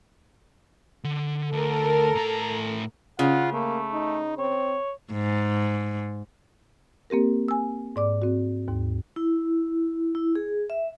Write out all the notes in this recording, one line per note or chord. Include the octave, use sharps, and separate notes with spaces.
D3
D2 A4 A#4
A2 A#5
C#3 F4 F#5
A3 A#3
D#4
C4 C#5
G#2
A#3 C4 G4 A#4
G#5 E6
G#2 D5 D6
C4 F#4
D#2 G#2
E4
E4
G#4
E5